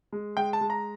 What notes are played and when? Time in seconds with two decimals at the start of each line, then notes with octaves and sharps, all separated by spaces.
0.13 G#3
0.37 G#3 G5
0.53 A5
0.61 G#3
0.70 A#5